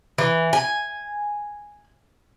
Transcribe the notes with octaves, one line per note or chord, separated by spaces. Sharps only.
E3
G#5